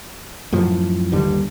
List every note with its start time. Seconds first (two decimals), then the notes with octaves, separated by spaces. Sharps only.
0.52 F#2 A2 F3
1.12 G1 D#2 D3 G3